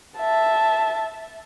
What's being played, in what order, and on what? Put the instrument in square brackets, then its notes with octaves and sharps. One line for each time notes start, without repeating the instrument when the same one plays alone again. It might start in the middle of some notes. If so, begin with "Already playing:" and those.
[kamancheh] E5 A5